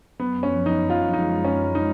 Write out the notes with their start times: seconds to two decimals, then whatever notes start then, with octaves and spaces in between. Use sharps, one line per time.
0.20 F#2 B3
0.43 C#4
0.51 F3
0.66 D#4
0.82 F#2
0.90 F4
1.13 G#3 D#4
1.44 F#2 C#4
1.75 F3 D#4